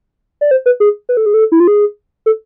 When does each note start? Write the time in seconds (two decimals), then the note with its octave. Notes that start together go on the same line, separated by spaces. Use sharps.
0.41 D5
0.51 C5
0.66 B4
0.80 G#4
1.09 B4
1.17 A4
1.26 G#4
1.34 A4
1.52 E4
1.60 F4
1.68 G#4
2.26 A4